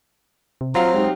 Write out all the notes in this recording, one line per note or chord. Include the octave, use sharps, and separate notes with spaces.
C3
F#3 C4 F4 F5 A#5
G#3 D#4 G4